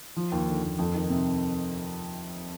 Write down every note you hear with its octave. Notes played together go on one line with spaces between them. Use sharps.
F3
D#2
D3
D#2
F2
D#3
C3